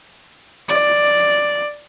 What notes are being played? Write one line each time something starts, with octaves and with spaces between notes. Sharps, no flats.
D5